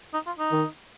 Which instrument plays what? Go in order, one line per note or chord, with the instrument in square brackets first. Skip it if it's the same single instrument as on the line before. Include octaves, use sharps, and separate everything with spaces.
[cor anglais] D#4
F4
D#4
[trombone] D#3